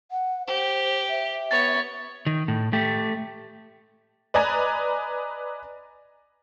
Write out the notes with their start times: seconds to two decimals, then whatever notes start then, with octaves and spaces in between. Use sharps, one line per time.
0.11 F#5
0.47 G4 C5
1.09 E5
1.51 B3 C#5 A6
2.26 D#3
2.48 A2
2.73 A3 G4
4.34 B4 D5 D#5 G#5 A#5